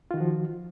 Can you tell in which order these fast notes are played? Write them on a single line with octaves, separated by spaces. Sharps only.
F4 D#3 F#4 F3